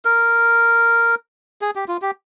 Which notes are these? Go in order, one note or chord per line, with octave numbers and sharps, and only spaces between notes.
A#4
G#4
G4
F4
G4